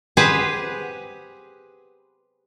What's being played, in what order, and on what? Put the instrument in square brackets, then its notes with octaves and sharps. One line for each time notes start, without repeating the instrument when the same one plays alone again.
[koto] G4 G#4 B4 C5 F#5